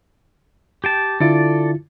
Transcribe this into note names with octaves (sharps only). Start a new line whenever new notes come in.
G4 G5 A5
D3 E4 F4 A4 D5